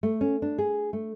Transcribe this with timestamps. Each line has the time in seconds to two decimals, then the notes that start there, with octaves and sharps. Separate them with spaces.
0.03 A3
0.21 C#4
0.42 D4
0.58 G#4
0.93 A3